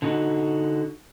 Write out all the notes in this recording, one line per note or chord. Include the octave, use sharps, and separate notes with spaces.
D3 D#4 F#4